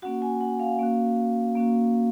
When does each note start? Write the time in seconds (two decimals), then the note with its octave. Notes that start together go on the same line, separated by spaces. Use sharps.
0.02 A#3 C#4 F#4 F#5
0.22 G#5
0.41 F#5
0.60 F5
0.79 A#3 C#4 F#4
1.55 A#3 C#4 F#4